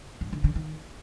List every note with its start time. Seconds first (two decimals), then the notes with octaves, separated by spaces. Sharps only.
0.21 G2
0.33 D3
0.44 D3
0.56 D#3